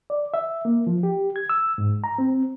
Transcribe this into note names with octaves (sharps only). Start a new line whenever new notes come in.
D5
E5
A#3
F3
G4
G#6
E6
G#2
A#5
C4